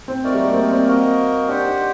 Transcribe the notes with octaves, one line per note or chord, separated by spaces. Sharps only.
C4
A3 D#4 F#4 A#4 D5
G3
A#3
C4
C4
A#3 F#4 A#4 D#5
D4 G4 C5 F#5
D#4